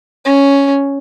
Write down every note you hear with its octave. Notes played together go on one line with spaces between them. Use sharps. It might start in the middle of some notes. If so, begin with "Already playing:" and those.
C#4